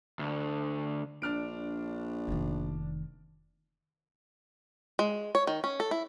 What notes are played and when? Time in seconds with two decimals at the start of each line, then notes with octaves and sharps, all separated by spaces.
0.19 D2
1.22 A#1 D4 F6 D7
2.28 F1 D#3
4.99 G#3
5.35 C#5
5.47 D#3
5.64 C#4
5.80 A4
5.91 E4